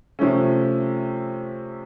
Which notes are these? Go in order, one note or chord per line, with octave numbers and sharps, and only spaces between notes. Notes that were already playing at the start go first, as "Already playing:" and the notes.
C3 F3 A3 C#4